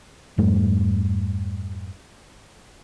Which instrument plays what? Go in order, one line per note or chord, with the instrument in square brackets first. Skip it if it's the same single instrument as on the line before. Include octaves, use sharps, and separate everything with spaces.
[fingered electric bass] F2 G#2 G3 A3